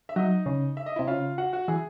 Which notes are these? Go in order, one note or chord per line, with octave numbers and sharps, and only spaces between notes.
E5
F#3 D#4 D#5
C#3
E5
D#5
C3 E4 E5
C#3 F4 F5
F#4 F#5
F#4 F#5
E3 G#4 G#5